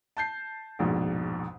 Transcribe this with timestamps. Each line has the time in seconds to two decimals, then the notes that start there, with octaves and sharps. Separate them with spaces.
0.17 A5 G6 C7
0.79 A#1 F2 G#2 B2